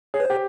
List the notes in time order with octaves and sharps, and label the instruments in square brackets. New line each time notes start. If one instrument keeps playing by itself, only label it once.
[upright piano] G#4 [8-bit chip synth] C#5
[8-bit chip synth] B4
[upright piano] G4 [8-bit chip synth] C5